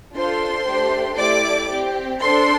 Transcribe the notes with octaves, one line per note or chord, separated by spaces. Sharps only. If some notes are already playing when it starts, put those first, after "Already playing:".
D4 F4 A4 C5 C6
A3 D4 G4
A3 E4 G4 D5 D6
C4 G4
D4 A4 C5 C6